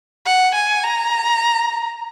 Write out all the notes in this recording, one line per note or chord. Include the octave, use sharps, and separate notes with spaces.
F#5
G#5
A#5